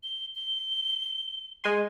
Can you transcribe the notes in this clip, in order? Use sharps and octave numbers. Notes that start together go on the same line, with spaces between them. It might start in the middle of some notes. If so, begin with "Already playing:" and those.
G7
G7
G#3 G#5 C6